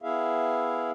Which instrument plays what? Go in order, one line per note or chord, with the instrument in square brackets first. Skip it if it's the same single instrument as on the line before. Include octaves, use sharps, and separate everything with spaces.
[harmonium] B3 E4 G#4 E5 F5